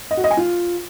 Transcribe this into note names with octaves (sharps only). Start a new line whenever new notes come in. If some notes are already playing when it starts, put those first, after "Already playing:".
D#5
F#4
D#5
G#5
F4